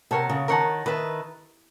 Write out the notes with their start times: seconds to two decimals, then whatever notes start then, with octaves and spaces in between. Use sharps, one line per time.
0.11 C3 A#4 C#5 F#5 A5
0.29 C#3
0.48 D#3 A#4 C#5 F#5 A5
0.86 D#3 B4 E5 A5